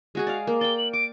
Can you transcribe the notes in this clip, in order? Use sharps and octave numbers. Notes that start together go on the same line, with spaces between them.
G#3 F#4 G#4
D5 F5
A#3
D5 G5 G7
F#7
D6 D7